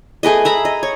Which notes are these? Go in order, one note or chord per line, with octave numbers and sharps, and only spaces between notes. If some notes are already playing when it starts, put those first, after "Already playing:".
A3 G#4 B4 D#5
E5 A#5 B5
D#5
C#5